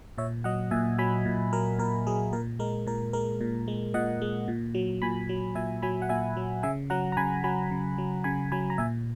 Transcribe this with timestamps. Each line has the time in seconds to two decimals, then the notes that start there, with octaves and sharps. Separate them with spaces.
0.18 A#2 C#5 E5
0.44 F#3 D#5 F#5
0.71 A#2 E5 G#5
0.98 F#3 G#5 B5
1.25 A#2
1.53 F#3 A#4
1.79 A#2 A#4
2.07 F#3 G#4
2.33 A#2 A#4
2.59 G#3 A#4
2.87 A#2 A#4
3.13 G#3 A#4
3.41 A#2
3.68 G#3
3.94 A#2 D#5 F#5
4.22 G#3
4.48 A#2
4.75 F#3
5.02 A#2 G#5 B5
5.29 F#3
5.55 A#2 E5 G#5
5.82 F#3 G#5 B5
6.02 F#5
6.09 A#2 E5 G#5
6.37 F#3
6.63 C#3 E5 G#5
6.90 F#3 F#5 A#5
7.12 A#5
7.17 C#3 G#5 B5
7.44 F#3 G#5 B5
7.71 C#3
7.98 F#3
8.24 C#3 G#5 B5
8.52 F#3 G#5 B5
8.70 A#5
8.78 A#2 E5 G#5